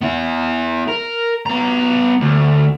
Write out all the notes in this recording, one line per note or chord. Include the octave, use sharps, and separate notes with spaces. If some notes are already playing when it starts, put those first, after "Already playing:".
B3 E4
A#4
B3 A#5
D2